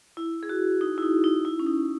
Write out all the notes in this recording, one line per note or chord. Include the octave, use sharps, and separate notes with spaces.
E4
G#4
F#4
D#4
E4
D#4
D#4
E4
C#4
D#4